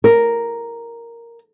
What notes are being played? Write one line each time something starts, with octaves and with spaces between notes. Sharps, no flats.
A#4